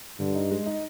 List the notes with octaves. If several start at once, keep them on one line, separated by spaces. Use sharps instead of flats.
G2 D3
D#4
G#3
D#4